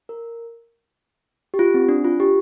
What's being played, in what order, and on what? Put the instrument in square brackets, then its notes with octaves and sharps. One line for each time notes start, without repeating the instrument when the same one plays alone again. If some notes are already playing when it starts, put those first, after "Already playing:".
[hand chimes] A#4
G4
F4
C4
D4
F4
G4